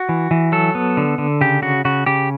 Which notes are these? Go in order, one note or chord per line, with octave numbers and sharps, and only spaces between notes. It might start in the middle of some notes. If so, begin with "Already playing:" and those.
Already playing: F#4
E3
E3
F#3 A4
B3
D3
D3
C#3 G4
C#3 F#4
C#3 F#4
C#3 G4